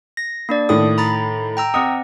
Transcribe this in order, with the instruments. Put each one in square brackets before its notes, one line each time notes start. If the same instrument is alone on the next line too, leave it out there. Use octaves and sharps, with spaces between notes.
[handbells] A#6
A#3 D4 D5
[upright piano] A2 D#3 [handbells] D#6
[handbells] A#5 B5 A6
G5 A#5 E6
[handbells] C4 D#5 F#5 [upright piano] D#6